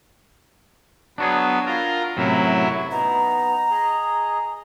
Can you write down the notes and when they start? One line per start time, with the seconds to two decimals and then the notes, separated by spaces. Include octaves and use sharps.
1.18 F#3 B3 D4 F#4 G#4
1.66 F4 A#4
2.17 F#2 A2 C3 F#3 E4
2.91 B3 D#4 A#5
3.71 G#4 D#5